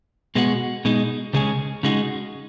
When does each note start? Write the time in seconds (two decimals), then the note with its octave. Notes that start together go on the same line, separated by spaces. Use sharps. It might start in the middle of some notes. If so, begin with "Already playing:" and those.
0.35 B2 G#3 B3 F#4
0.85 B2 G#3 D#4
1.33 C#2 C#3 G#3 C#4 G#4
1.83 C#3 G#3 D#4 F#4